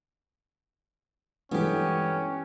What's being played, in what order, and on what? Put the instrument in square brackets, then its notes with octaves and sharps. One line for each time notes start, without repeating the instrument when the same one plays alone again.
[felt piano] G2 E3 [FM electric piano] G#3 A4 [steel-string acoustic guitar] B3 G4 [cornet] C#4